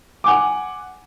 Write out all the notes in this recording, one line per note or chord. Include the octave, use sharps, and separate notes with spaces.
F#5 G#5 D6